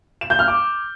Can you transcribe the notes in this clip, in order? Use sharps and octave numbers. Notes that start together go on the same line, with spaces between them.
E7
G6
F6
D6